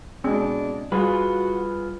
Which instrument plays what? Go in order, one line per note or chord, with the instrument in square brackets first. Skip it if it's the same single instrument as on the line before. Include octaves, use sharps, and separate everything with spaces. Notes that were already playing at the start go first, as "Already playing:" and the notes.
[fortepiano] B2 G#3 [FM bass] C4 [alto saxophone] D4
[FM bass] G3 [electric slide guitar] F4 B4 [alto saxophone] F#4 [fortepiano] G#4